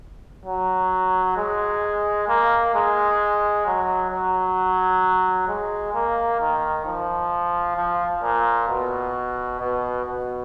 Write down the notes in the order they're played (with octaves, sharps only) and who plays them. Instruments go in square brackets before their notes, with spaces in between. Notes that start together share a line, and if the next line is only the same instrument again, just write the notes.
[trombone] F#3
G#3
A#3
G#3
F#3
F#3
G#3
A#3
D#3
F3
F3
A#2
B2
B2
B2